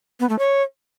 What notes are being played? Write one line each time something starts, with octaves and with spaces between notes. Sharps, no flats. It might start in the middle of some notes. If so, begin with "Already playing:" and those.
B3
A3
C#5